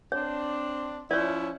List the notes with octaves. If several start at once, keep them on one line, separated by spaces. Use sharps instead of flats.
C4 D4 C#5
F3 C#4 E4 C#5 D5